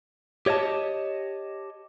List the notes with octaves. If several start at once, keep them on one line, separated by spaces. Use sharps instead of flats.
G4 C#5 D#5 E5 A5